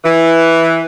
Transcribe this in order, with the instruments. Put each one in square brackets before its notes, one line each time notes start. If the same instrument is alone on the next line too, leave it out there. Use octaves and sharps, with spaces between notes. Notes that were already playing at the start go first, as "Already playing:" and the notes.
[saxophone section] E3